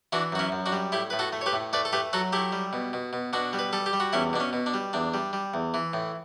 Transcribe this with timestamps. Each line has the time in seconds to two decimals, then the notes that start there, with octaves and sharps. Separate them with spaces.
0.13 E3 D4 F#4
0.32 F#2 F#4
0.39 C#4 E4
0.52 F#2
0.66 D4 F#4
0.72 G3
0.92 A2 E4 G4
1.10 A2 B4
1.19 F#4 A4
1.33 A3
1.41 C#5
1.46 G4 B4
1.53 A2
1.73 A3 B4 D5
1.85 A4
1.93 A3 G4 B4
2.13 F#3 F#4 A4
2.33 A3 E4 G4
2.52 G3
2.73 B2
2.93 B2
3.13 B2
3.33 B2 D4 F#4
3.53 G3
3.59 B4
3.73 G3 A4
3.86 G4
3.93 G3
4.00 F#4
4.13 E2 C#4 E4
4.33 B2 D4
4.40 C#4
4.53 B2
4.66 D4
4.74 G3
4.93 E2 D4
5.14 G3
5.33 G3
5.54 E2
5.74 E3
5.93 A2